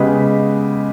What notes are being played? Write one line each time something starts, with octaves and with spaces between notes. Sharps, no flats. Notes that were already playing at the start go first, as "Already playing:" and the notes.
Already playing: C#3 G#3 B3 G4 B4